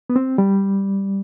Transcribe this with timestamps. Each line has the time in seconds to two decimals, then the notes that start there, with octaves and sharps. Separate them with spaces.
0.10 B3
0.16 C4
0.38 G3